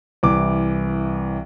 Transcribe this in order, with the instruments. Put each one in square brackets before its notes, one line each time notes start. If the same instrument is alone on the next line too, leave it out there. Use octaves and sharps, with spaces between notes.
[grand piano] C2 E3 D6